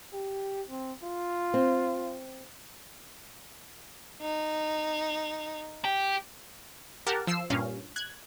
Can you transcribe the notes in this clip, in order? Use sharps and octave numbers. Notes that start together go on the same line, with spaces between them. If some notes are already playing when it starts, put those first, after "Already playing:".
G4
C4
F4
C4
D#4
G4
G4 A#4 F#5 A5
F3 E6 C7
G2 A#2 C#4 F5
F#6 G#6